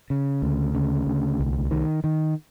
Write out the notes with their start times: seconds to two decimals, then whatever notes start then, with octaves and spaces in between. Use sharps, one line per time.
0.10 C#3
0.42 D2
0.75 C#3
1.07 D2
1.39 C2
1.71 D#3
2.04 D#3